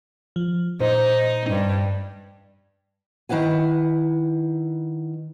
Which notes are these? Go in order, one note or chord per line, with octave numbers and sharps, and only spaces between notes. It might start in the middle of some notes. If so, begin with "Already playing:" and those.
F3
A#2 D#4 C5
G2
D#3 E4 B4 F#5 G#5